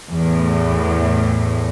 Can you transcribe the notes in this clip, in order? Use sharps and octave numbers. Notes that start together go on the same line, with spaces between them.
E2 A2